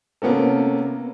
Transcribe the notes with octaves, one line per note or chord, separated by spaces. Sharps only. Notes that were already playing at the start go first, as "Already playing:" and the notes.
C3 A#3 B3 C#4 A4